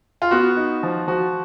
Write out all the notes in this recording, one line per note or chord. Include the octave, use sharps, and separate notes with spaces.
F4
B3 F#4
D#4
F3
F3 F#4